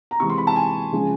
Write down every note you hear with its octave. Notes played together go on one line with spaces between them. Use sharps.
A#5
C3 E3 G#3 C#6
C6
B5
A5
G#5
C#3 F3 G#3